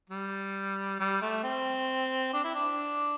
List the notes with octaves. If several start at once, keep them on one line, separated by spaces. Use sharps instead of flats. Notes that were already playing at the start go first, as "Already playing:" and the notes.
G3
G3
A3
C4
D4
E4
D4